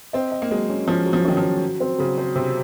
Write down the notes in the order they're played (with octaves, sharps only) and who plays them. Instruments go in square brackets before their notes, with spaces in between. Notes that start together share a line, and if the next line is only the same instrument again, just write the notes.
[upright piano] C4 [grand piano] D#5
[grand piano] D#5
[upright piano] A#3
[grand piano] F#3 [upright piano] G#3
[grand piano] C#4
[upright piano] F3 [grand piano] C#4
[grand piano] F#3
[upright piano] F3
[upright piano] D#3 [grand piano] C#4
[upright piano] F3
[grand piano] F#3
F#3
C4
[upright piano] C#3 [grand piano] F#3
[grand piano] C5
[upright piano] C3 [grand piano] C5